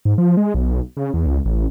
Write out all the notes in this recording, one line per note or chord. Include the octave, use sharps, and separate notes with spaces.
G#2
F3
G#3
B1
C#3
E2
C#2
A1